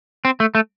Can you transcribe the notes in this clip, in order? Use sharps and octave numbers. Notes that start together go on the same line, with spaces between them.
C4
A3
A3